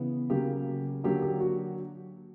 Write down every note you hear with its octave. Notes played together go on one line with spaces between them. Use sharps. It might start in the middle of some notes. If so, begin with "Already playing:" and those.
Already playing: C#3 E3 B3
C#3 F#3 A#3 G4
D3 F#3 A#3 G4
G4
F#4